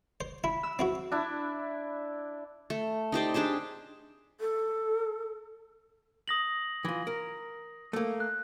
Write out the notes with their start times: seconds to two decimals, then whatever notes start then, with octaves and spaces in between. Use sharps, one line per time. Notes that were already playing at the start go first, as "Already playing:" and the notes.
0.21 C5
0.44 E4 B5
0.63 E6
0.79 C4 E4 F#4
1.12 D4 E4
2.70 A3
3.12 D#4 G4 C5 D5
3.34 D4 G4 G#4 A5
4.40 A4
6.28 D#6 A#6 F#7
6.85 E3 F4
7.07 A#4
7.93 A3 A#3
8.20 F#6